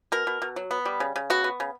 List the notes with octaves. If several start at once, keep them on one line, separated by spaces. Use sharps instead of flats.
B2 A#4
B2
B2
F#3
B3
G3
C#3
C#3
B3 F#4
B3
C#3